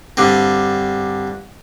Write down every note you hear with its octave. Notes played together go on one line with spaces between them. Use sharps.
G2 D3 C4